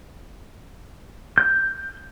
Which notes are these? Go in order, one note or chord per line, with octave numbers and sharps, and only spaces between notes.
G6